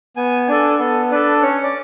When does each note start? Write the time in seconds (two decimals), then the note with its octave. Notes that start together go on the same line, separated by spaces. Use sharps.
0.17 B3 G#5
0.48 D4 A4 G#5
0.79 B3 A4
1.11 D4 A4 B4
1.42 C#4 C#5
1.63 D5